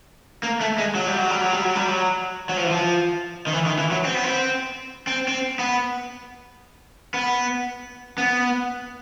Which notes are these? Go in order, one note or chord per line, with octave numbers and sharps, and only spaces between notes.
A#3
A3
G#3
F#3
G3
F#3
G3
F#3
G3
F#3
G3
F#3
F#3
F3
E3
F3
D#3
E3
D#3
E3
F#3
C4
B3
C4
C4
C4
B3
B3
B3